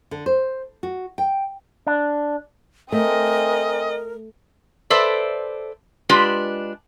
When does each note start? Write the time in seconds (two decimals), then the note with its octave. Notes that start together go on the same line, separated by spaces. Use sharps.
0.11 D3
0.26 C5
0.83 F#4
1.18 G5
1.87 D4
2.92 A3 C4 A#4 D#5 G#5
4.90 A4 B4 C5 D5 E5
6.09 G#3 D4 F4 G4 B4